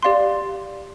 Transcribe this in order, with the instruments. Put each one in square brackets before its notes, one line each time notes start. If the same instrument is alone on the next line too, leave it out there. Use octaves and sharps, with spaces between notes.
[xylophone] G4 D5 F5 C6